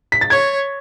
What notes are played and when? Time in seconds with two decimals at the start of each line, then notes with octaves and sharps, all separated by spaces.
0.12 B6
0.21 A6
0.30 C#5 G#6